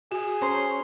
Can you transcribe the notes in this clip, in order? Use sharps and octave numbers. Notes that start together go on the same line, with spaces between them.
F#4 G#4
C#4 C5 A#5 C6